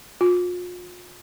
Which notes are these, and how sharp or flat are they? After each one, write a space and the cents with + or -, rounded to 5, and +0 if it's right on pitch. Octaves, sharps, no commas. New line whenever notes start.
F4 +40